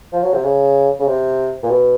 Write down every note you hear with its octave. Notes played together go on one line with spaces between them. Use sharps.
F3
F#3
C3
C#3
C#3
C3
A#2
B2